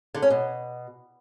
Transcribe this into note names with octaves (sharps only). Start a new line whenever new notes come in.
D3
C#4
B2